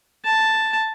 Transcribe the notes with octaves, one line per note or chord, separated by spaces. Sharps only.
A5